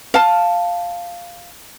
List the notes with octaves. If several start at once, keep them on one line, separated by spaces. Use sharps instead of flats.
F5 A5